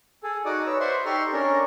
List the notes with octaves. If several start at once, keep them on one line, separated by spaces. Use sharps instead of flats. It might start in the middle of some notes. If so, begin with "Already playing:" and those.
G#4 A4
D#4 F#4 D5 D6 D#6
B4 C#5 E6
C5 D5 E5 F#5 C6
D#4 G4 A4 A#5 C6 C#6
C#4 D4 A#4